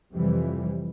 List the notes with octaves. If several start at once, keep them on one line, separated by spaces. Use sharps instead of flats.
F2 C3 E3 G3